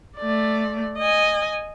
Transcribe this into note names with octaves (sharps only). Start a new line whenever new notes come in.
A3 D5
D#5 G#5